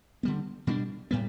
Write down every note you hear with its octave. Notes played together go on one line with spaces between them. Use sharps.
D3 G3 B3
B2 G3 B3 D4
A2 G3 B3